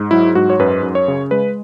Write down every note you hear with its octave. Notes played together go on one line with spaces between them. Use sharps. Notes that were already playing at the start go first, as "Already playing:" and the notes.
Already playing: G#2
F#3 E4
G#2 F#4
C#5
F#2 B4
F#2
C#5
C#3
G#3 B4